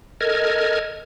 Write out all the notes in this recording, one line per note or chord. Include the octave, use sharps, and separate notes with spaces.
A4 A#4 D#5 F6 G#6